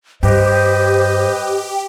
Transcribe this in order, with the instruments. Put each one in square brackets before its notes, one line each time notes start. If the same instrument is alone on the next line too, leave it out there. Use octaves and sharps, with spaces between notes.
[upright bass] G2 [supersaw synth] G4 [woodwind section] B4 D#5 [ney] C5